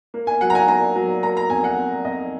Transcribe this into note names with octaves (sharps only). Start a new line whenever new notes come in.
A#3
G#5
F#3 F#5
A#5
G#5
A#3 A#5
F#3
A#3 A#5
A#5
F2 G#5
F#5
F2
F2 D#5